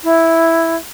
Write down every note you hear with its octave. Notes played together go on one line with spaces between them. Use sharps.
E4